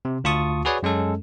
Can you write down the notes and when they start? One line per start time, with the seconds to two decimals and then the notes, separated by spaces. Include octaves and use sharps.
0.05 C3
0.24 D2 F4 A5 C#6 D#6
0.65 F#4 G#4 B4 C#5 D5
0.83 F#2 G#3 C#4 A4